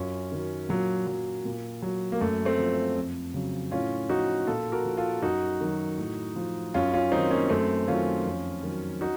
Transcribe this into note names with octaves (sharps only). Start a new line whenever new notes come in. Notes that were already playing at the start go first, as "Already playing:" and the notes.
Already playing: F#2 C#4 F4
D#3 F#3
A#2 F#3
F#3
A#2
F#3
A#3
F#2 A3
A3 C4
F3
F2
C#3 F#3
A2 C#4 F4
F3 D#4 F#4
A#2 F4 A4
F#4 A#4
F3
F4 A4
F#2 D#4 F#4
D#3 F#3
A2
F3
F#2 C#4 F4
C#4 F4
D#3 F#3 C4 D#4
A#3 C#4
F#2 A3 C4
D#3 F#3 C#4 F4
F2
D#3 F#3
D#4 F#4